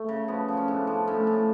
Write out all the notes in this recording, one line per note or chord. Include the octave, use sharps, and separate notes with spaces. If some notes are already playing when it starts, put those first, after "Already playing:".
Already playing: A3
C#3
F3 B3
F3
C#4
A2 D4
F3
A2 C#4
A2